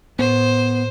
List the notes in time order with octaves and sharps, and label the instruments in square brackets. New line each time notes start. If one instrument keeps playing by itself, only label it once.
[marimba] A2 [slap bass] B3 [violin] C5